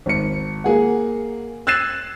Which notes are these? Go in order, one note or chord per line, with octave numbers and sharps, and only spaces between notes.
G#1 C#7
A#3 G#4 F#5
E6 F#6 G#6 A6 C7 E7